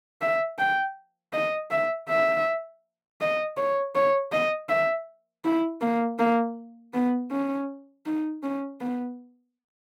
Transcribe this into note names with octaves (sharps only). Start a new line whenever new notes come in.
E5
G5
D#5
E5
E5
D#5
C#5
C#5
D#5
E5
E4
A#3
A#3
B3
C#4
D#4
C#4
B3